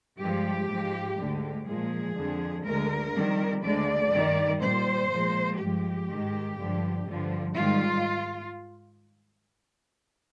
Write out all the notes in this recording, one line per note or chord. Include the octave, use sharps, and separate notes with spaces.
G2 F3 G#3 G4
G#2 F3 G#3
D2 D3 G#3
A#2 F3 G#3 G#4
F2 D3 F3
D2 D3 G#3 A#4
F2 D#3 G3
D2 D3 G#3 D5
G2 D#3 G3
A#2 G3 C5
A#2 F3 G#3
G2 F3 G#3 G4
G#2 D#3 G#3
G2 D3 F3
G2 D3 F3
G#2 D#3 G3 F4